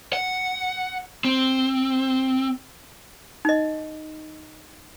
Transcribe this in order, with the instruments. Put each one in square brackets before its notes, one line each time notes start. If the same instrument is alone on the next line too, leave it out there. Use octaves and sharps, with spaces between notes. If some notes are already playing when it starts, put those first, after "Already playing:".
[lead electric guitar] F#5
C4
[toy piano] D#4 D#5